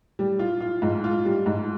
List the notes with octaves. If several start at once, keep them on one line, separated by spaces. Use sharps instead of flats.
G3
F4
F4
G#2
F4
G3
G#2